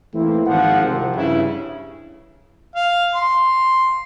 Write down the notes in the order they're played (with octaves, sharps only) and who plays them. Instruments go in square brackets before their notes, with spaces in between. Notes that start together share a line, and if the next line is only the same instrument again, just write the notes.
[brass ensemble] E3 A3 A#3 C4 E4
G#1 F3 F#5
C2 C3 F3
G2 C#3 E4
[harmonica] F5
C6